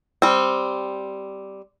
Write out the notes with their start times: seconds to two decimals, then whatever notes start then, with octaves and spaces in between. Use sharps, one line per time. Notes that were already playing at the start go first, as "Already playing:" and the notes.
0.22 G3 C4